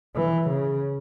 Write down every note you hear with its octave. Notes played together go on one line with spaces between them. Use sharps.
E3
C#3